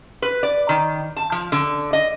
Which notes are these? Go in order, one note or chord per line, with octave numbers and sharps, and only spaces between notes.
B4
D5
D#3
A5
F3
D3
D#5